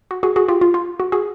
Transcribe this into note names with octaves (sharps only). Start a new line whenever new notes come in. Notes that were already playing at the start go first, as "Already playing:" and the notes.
F#4
F#4 G#4
F#4 G#4
F4 G4
F4
F4
F#4
F#4 G#4